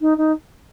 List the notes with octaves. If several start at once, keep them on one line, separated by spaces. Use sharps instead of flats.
D#4
D#4